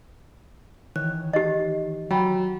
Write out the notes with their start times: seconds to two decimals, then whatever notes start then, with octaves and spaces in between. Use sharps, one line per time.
0.96 D#3 E3 C#5 F#6
1.33 D#4 G4 D#5
2.11 F#3 G5 B5